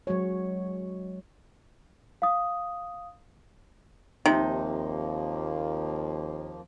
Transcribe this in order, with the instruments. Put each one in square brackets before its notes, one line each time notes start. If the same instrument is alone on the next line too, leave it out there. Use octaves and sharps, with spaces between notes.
[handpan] F#3 G#3 F#4 C#5
[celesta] F5 D#6
[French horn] D#2 [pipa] C3 [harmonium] F3 A#3 [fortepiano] D#4